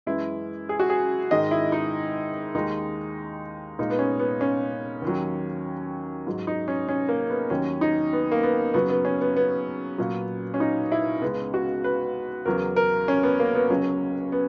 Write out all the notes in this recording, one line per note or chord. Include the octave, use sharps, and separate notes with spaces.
F#2 E3 G#3 E4
G#4
F#4
G#4
G#2 D#3 G#3 D#5
E4
D#4
D#2 D#3 G#3 D#4
A#2 G#3 D#4
B3
C#4
B3
C#4
D#2 D#3 F#3
G#2 F#3
D#4
C#4
C#4
A#3
B3
D#2 D#3 F#3 C#4
D#4
B3
A#3
B3
F#2 C#3 F#3 B3
B3
C#4
B3
B3
A#2 F#3
C#4
D#4
E4
C#2 C#3 G#3 B3
F#4
B4
E2 C#3 F#3 A#4
A#4
C#4
B3
A#3
B3
C#2 C#3 F#3 C#4
B3